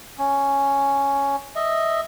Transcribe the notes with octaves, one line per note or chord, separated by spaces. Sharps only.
C#4
D#5 E5